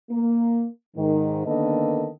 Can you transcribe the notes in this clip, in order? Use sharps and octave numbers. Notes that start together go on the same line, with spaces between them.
A#3
G#2 D#3
D3 D#3 A#3 B3 A4 D#5